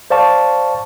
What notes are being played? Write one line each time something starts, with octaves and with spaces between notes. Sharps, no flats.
C5 D5 F5 A5 C#6